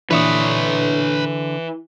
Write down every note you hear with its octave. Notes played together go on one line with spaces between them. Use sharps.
A#2 D3 E3 D4 B4 C#5 E5 D#6